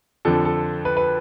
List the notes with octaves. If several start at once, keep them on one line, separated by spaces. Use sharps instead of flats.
F2 D3 F3 A4
A4
B4
B4